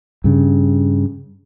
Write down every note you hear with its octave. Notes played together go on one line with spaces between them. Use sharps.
G2 C#3